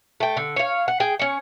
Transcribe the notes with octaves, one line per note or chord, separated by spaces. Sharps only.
A3 G5
D3
C#5 F5
F#5
G#4 G5
C#4 C#5